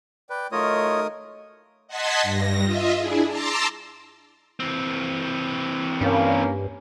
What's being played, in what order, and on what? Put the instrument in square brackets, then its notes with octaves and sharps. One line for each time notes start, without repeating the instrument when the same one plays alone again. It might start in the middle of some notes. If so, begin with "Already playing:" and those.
[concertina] B4 [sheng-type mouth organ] D5 G5
[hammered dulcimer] D#3 F#3 [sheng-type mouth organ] A3 A#4 D#6 [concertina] F4 C#5 D#5
[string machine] D#5 F#5 A5 C6 G#6 B6
G2 A#6
F4 D#5 E5
D4 E4 G#4
A5 A#5 C6 D6 E6
[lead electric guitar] E3 C4
[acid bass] G2 [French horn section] A#3 C#4